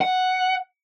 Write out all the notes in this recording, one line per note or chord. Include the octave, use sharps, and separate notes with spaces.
F#5